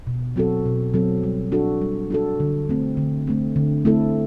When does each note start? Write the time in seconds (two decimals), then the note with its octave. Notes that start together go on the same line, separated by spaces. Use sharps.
0.07 B2
0.36 F#3 C4 F#4 A4
0.66 B2
0.94 F#3 C4 F#4 A4
1.24 G3
1.52 D4 F#4 A4
1.81 G3
2.11 D4 F#4 A4
2.40 D3
2.69 A3 C4
2.97 D3
3.27 A3 C4
3.56 D3
3.85 A3 C4 E4 A4